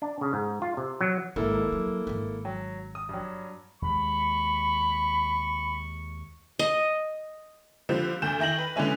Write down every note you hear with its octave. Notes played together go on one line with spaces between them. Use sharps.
D4
C#3
G#2
F4
C3
F#3
G#1 D#3 A#3 E4 A4
F#3
G#1 D#4
F#3
D#6
G2 F#3
D#2 C3 G#3 B5 C#6
D#5
D3 F3 G3 C4
D2 G6 E7
D#3 E4 G5 A#6 F#7
B4
D3 E3 G#3 C#4 E4